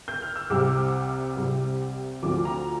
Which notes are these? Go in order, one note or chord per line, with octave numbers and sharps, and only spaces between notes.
G6
F6
E6
C2 C3 G3 D6
C2 C3 G3
D2 D3 F3 D6
A#5